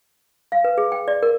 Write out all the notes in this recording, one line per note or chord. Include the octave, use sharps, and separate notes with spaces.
F5
B4
G#4
G5
D5
A#4